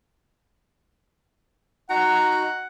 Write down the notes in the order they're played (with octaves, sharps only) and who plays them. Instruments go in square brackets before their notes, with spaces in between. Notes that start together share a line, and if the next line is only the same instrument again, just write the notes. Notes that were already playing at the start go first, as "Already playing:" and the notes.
[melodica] D#4 F#4 A#5 [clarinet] F#5